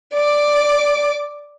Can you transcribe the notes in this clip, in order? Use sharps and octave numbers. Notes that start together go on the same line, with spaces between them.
D5 D6